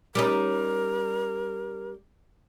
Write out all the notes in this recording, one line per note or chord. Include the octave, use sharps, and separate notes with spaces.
G3 C#4 D#4 A#4